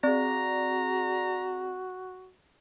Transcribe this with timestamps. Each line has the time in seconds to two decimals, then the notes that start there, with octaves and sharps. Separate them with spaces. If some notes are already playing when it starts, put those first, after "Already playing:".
0.04 C4 F#4 G#4 D5 A#5